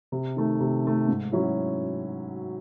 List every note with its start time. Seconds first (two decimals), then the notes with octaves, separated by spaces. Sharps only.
0.12 C3
0.36 D#3 A3
0.60 C3
0.84 D#3 A3
1.08 G#2
1.32 F#3 C#4 E4